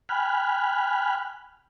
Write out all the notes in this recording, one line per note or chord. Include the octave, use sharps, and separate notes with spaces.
G5 G#5 B5 F6 F#6